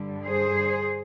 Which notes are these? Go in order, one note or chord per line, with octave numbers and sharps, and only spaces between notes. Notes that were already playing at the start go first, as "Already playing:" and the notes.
Already playing: G2 D3 G3
G#4 C5